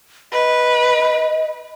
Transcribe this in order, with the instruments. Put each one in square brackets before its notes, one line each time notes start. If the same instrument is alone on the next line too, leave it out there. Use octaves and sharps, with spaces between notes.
[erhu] B4 [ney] D#5